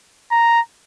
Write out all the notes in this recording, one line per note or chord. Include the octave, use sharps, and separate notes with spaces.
A#5